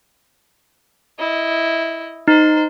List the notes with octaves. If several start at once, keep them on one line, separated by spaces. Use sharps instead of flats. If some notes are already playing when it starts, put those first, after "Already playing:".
E4 D#5
D#4 C5